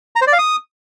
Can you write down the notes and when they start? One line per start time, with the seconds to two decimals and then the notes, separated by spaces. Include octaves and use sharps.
0.16 A#5
0.21 C5
0.27 D5
0.33 F5
0.38 D#6